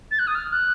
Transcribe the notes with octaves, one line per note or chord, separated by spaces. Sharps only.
A6
F#6
D#6
F6
F#6